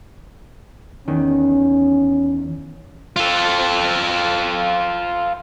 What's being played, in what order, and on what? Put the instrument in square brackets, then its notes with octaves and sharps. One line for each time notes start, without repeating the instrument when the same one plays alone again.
[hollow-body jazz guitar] E2 D#3 [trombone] C#4
[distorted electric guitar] F4 A4